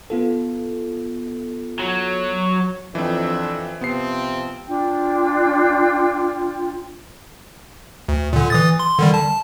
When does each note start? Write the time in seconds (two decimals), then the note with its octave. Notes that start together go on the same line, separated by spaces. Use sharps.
0.10 B3 F4 A4
1.80 F#3
2.95 F2 E3 F3 C4 D4 E5
3.81 C3 F3 B3 C4 C7
4.67 D4 F4 G5
8.09 D2
8.33 A#2 D3
8.50 E3 D#6 A6
8.79 C6
8.99 D3 D#3 G3
9.14 A5